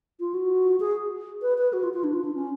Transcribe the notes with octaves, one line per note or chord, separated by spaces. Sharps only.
F4
F#4
G#4
B4
B4
F#4
F4
F4
D4
F4
D4
C#4